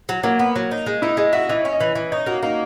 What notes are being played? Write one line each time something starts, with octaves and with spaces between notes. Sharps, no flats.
F#3
F#3 A#3
B3
F#3
D#4
G#3
D#4 E4
G#3 D#5
F#4 E5
E3 D#5
C#4 C#5
D#5
E3
E3
D#4 C#5
A#3 F#4
A#3 D#4